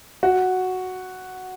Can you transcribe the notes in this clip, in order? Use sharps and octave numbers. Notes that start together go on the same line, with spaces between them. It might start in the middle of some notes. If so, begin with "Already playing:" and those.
F#4